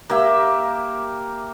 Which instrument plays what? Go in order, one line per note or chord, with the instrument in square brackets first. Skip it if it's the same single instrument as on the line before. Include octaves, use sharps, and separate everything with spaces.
[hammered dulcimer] A#3 G4 E5